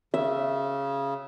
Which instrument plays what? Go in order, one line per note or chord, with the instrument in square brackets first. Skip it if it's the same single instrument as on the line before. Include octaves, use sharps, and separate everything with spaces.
[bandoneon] C#3 [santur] E5